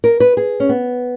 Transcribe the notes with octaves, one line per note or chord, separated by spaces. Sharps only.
A#4
B4
G#4
C#4
B3